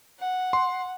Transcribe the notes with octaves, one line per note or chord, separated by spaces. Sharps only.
F#5
C6